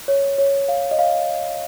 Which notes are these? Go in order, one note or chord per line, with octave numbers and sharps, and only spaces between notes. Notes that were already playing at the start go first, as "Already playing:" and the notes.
C#5
C#5
F5
D#5
F5